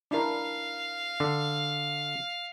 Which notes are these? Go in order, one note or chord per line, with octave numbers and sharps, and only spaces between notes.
D4 E4 A#4 F5
D3